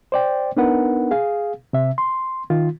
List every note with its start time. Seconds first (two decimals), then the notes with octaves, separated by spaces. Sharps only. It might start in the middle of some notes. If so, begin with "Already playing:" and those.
0.12 C5 D5 G5
0.57 B3 D4 D#4 A#4 B4 F#5
1.11 G#4 F5
1.73 C3 E5
1.98 C6
2.50 D#3 F4